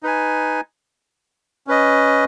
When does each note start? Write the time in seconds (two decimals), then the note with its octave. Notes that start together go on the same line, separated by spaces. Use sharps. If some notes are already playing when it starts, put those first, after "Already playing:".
0.03 D#4 B4 G#5
1.67 C#4 B4 D#5